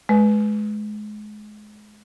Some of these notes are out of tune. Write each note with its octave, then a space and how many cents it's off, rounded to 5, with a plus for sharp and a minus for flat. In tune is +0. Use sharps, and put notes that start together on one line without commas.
G#3 +25 B4 +0